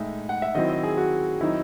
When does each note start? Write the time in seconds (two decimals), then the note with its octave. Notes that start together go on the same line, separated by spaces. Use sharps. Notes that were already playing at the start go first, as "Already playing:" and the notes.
Already playing: A2 G#3 D#4 E5
0.29 F#5
0.42 E5
0.55 D#3 F#3 C4 E4 D#5
0.69 D#5
0.83 G#4
0.98 F#4
1.41 D#3 F#3 C4 D#4 E4